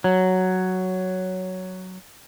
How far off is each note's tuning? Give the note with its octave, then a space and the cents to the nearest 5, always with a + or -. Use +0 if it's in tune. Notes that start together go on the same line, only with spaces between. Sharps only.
F#3 +5